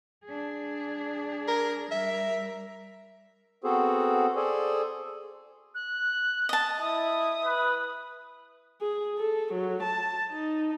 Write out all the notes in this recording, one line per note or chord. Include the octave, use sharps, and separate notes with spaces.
D4 G#4
A#4
G3 A#4 E5
B3 C4 F#4 G#4 A4 C5
G#4 A4 C5 D5 G#5
F#6
D#5 A5
E4 D#6
B4
G#4
A4
F#3
A5
D#4